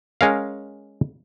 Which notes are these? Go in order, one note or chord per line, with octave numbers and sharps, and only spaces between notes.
G#3 C#4 A#4 F5